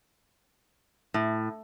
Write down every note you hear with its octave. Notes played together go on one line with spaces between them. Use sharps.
A2